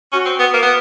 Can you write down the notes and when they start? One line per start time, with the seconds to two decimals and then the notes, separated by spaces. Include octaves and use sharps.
0.12 C#4 F#4
0.26 C4
0.39 B3
0.54 A#3
0.63 B3